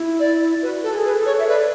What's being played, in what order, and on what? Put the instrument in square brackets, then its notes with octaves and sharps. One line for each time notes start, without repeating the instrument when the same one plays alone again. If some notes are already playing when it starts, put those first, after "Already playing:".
Already playing: [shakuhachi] E4
[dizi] D5
[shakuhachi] F#4 [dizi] B4
[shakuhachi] F#4 [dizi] A4
[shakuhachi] G#4
[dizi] B4
[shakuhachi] A4
[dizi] C#5
[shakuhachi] E5
[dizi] B4 [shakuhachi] D5